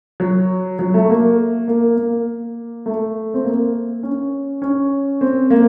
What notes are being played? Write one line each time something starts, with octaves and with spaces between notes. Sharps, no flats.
F#3
F#3
A3
A#3
A#3
A#3
A3
C4
A#3
C#4
C#4
C4
A#3